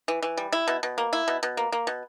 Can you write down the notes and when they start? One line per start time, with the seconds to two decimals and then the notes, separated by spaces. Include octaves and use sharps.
0.08 E3
0.23 E3
0.37 G3
0.52 E4
0.68 B2
0.83 B2
0.98 A#3
1.13 E4
1.28 B2
1.43 B2
1.57 A#3
1.72 A#3
1.87 B2